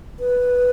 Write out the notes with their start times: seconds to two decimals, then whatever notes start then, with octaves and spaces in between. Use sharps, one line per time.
0.20 B4